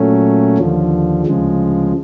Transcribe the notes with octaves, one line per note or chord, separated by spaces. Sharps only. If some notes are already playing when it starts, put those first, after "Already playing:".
Already playing: A#2 F#3 A3 C#4
D#2 D3 F3
D2 C#3 F3 G#3